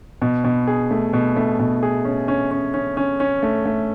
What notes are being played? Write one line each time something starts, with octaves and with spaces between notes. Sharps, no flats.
B2
B2
G#4
A3
B2
A3
B2
G#4
C#4
C#4
C#4
C#4
C#4
C#4
A3
A3